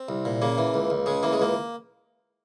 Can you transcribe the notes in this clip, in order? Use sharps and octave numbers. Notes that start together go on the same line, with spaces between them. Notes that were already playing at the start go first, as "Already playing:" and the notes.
Already playing: C4
C2
A#2
C#3 A#3
E3
C#2
C#2
C#3 G#3
E3 A#3
G#3
C#2 A#3